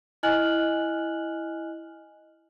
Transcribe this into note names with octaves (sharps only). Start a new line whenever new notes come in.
E4 D#5 G#5 F6 F#6 F#7